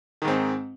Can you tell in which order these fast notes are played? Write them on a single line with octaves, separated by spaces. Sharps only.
D#3 G#2 C4